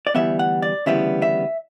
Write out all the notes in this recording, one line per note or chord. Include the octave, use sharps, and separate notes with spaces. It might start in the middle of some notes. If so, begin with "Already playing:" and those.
D5
D2 C#3 E3 G3 B3 E5
F#5
D5
D2 C#3 E3 G3 B3 E5
E5